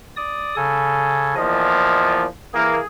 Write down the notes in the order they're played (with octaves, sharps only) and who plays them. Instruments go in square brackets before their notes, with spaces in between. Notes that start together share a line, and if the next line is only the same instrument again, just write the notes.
[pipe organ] D5 D#6
C#3 A4 G#5
[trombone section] E2 A#2 F3 [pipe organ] D#5
[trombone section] E3 A#3 [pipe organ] G#4